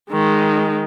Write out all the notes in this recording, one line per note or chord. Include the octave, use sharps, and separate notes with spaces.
D#3 G#3